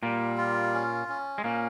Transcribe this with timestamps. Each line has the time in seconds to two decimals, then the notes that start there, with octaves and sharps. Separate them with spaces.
0.03 A#2 G3 A#3
0.38 F4
0.74 C#4
1.09 C#4
1.38 G#3
1.44 A#2 A#3 C#4